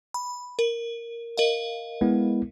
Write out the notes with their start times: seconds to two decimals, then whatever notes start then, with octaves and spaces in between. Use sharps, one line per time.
0.14 B5
0.59 A#4
1.37 A#4 D#5 F5
2.01 G#3 B3 E4